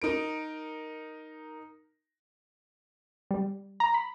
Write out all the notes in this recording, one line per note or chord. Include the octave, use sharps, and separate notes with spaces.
D#4 A#4 D7
G3
A#5
B5